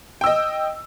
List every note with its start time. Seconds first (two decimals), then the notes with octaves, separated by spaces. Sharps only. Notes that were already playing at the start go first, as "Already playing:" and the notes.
0.21 G5
0.24 E6
0.26 D#5